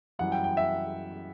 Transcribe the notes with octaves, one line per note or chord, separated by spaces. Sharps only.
F#2 E3 G3 F#5
G5
G5
E5